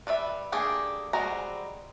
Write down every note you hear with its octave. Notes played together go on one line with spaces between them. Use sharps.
G3 B4 D5 E5
A3 A#3 D4 G4 G#4
G3 G#3 C4 F#4 A#5